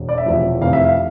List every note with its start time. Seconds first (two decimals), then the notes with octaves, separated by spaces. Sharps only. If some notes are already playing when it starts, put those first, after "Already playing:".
Already playing: E1
0.09 D5
0.18 E5
0.26 E1 E2 C3 F3
0.61 F1 F2 C3 E3 F5
0.73 E5
0.84 F5